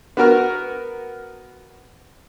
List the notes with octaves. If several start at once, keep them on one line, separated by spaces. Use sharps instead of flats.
B3 F#4 A#4 F6